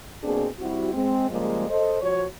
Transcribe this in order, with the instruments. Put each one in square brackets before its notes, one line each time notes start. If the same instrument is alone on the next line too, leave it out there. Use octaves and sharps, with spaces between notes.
[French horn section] B2 A#3 C4 D4 G#4
G3 C4 E4 F#4
G#3 C4
C#3 F3 G3 G#3 A#3
A4 C5 D#5
F3 F#4 C#5